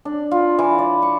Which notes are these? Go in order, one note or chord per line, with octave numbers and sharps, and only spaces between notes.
D4
F4
E3
D5
C#6